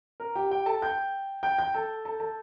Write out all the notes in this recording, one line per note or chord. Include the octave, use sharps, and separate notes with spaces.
A#4 A#5
G4 G5
G4 G5
A4 A5
G5 G6
G5 G6
G5 G6
A4 A5
A4 A5
A4 A5